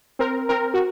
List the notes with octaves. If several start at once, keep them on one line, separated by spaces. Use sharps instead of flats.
C4 A#4
C4 A#4
F#4